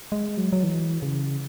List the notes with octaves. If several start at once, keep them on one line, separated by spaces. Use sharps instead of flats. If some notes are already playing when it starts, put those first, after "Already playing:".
G#3
F#3
F#3
E3
C#3